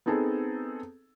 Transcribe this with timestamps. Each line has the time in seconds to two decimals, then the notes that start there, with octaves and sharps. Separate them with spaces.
0.06 B3 C4 D#4 G#4 A4